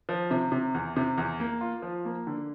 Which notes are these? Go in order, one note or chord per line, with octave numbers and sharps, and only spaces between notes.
F3
C3
C3
E2
C3
E2
A#3
F4
F3
A#3
D3